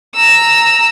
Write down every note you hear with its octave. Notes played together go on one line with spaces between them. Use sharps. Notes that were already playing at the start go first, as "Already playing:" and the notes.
A#5 E6